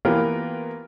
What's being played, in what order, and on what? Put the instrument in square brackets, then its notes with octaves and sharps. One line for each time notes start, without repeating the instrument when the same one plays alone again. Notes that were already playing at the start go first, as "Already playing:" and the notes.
[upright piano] E3 A#3 B3 F4 G4 A#4